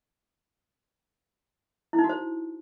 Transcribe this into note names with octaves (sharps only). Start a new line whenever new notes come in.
E4
D#4
F#4
C5